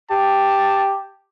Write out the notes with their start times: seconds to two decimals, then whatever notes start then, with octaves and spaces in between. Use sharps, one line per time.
0.10 G4 A5